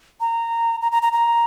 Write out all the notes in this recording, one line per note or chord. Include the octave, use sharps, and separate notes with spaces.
A#5
A#5
A#5
A#5
A#5